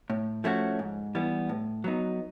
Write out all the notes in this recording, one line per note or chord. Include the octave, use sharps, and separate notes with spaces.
A2
F3 A3 C#4 F#4
G#2
E3 G3 B3
A2
F#3 B3 D#4